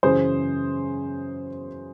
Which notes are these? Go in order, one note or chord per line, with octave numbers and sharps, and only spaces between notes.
F#2 C#3 E3 G#4 C5